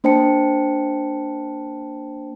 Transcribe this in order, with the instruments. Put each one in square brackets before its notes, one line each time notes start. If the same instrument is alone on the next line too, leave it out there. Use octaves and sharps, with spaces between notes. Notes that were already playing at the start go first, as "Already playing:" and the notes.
[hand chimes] A#3 D4 C5 G5 A5 C#7